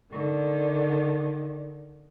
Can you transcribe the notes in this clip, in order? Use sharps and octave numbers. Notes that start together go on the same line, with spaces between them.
D3 D#3